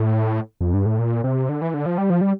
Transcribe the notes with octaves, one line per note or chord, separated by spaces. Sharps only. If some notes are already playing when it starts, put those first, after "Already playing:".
Already playing: A2
F2
G2
A2
A#2
C3
D3
E3
D3
F3
G3
F3
G3